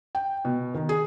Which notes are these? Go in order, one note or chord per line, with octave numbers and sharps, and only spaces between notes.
G5
B2
D#3
G#4